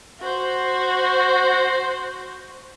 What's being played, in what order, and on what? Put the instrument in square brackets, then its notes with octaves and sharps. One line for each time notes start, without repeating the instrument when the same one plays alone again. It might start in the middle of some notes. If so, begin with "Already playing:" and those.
[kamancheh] F#4 C5